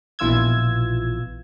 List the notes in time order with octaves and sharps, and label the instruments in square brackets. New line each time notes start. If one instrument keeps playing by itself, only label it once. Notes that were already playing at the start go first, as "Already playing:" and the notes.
[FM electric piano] A#1 B2 E3 F4 E6 G#6